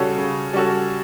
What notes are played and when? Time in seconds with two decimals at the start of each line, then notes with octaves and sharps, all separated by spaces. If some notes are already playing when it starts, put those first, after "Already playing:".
Already playing: C#3 G3 C#4 F#4 A4
0.18 C#3
0.53 G3 C#4 F#4 A4